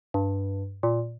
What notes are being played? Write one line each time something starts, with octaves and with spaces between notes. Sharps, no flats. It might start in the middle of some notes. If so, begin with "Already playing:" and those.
G2
A#2